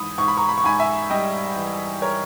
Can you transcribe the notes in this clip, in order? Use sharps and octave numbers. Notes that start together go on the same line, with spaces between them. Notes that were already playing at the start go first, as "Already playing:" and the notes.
Already playing: G#2 E3 B5 D#6
G#2 C#6
B5
A#5 C#6
B5
C#6
G#2 G#5 B5
E5 G#5
G3 D#5 G5
E3
A#4 C#5